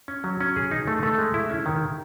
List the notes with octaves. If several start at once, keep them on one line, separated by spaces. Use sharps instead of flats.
C#4
F#3
C#4
G#4
D#4
A3
A3
G#3
E4
C#4
D#3